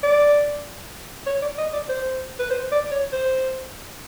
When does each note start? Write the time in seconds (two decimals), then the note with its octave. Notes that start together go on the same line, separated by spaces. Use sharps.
0.03 D5
1.26 C#5
1.42 D5
1.58 D#5
1.73 D5
1.89 C5
2.39 B4
2.50 C5
2.71 D5
2.91 C#5
3.12 C5